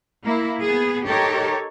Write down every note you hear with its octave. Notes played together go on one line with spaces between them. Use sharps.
A#3 E4
B3 G#4
D#4 G4 A4 A#4 C#5